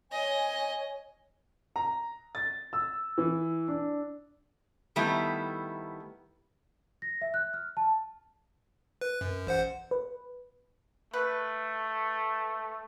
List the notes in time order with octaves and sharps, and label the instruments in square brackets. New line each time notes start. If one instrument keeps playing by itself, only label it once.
[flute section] C#5 G#5 [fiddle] D#5
[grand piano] A#5
A6
E6
E3
D4
[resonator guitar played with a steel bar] D#3 G3 A3 B3 E4
[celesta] A#6
E5
F#6
F6
A5
[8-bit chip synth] B4
F#2
A1 C5 F#5
[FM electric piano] B4
[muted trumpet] A3 [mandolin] B4